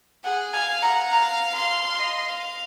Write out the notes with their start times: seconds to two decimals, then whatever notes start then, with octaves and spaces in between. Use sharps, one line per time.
0.24 G#4 F#5
0.53 F5 G#5
0.82 F#5 A#5
1.11 F5 A#5
1.55 F5 C6
1.99 D#5
2.28 F5